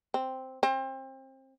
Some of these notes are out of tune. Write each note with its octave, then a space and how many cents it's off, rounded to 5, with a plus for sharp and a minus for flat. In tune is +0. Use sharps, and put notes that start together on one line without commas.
C4 +0
C4 +30